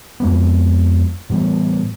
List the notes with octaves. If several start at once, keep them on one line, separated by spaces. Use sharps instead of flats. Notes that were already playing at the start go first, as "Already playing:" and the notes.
F2 G#3 B3
A2 E3 G3 B3